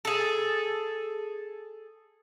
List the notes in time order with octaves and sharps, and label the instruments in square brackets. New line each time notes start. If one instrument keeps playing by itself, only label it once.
[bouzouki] G#4 A4